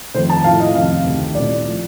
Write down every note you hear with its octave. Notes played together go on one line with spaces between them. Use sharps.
F2 D#3 A3 C5
A5
A2 F3 A3 F5
D#5
F2 C3 D#3 F5
D2 C3 D#3 A3
C2 A#2 A3 D5
F3 A3